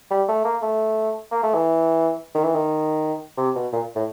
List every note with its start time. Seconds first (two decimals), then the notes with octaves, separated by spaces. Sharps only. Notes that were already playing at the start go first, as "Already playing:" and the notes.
0.11 G3
0.29 A3
0.45 A#3
0.62 A3
1.32 A#3
1.43 A3
1.54 E3
2.35 D#3
2.44 E3
2.55 D#3
3.38 C3
3.56 B2
3.73 A#2
3.96 A2